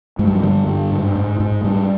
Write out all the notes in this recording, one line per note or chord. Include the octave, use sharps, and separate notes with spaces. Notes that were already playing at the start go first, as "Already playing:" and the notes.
G2 G#3
G3
F#3
D3 G3
G2
G#2
G#2
G#2
G#2 G3